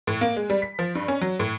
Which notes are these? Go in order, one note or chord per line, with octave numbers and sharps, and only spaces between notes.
A2
A#3
G#3
G3
B6
F3
G2
C#4
F#3
A2